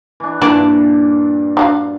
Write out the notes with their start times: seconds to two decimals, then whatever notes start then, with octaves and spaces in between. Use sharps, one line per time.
0.20 E3 D4
0.41 G2 A#2 E3 A#3 D4
1.57 D4 F#4 F5